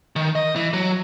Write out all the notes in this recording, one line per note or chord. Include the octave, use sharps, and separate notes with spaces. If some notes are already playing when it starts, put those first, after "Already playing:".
D#3
D#5
E3
F#3